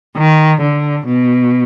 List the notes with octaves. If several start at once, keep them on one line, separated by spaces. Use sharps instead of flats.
D#3
D3
B2